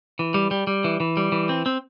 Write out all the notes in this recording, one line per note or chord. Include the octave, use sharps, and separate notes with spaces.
E3
G3
G3
G3
E3
E3
G3
E3
C4
C4